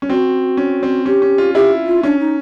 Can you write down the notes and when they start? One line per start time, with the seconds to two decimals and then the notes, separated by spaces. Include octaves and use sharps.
0.02 C#4
0.09 C4 F#4
0.57 C#4
0.83 C4
1.06 C#4 G4
1.22 C#4
1.38 F4
1.54 E4 G4
1.86 F4
2.03 C#4 D4
2.19 D#4